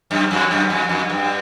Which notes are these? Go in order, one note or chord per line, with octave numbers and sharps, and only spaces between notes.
F#2
F2
F#2
F2
F2
G2